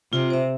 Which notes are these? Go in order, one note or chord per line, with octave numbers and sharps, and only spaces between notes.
C3 F4
C5 E5